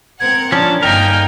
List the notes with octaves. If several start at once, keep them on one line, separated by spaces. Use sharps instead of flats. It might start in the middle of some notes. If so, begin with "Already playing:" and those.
C4 A#4 F#5 G#6
F3 C#4 D4 A5
G1 A#3 D#4 A#4 D#5 G5 G#5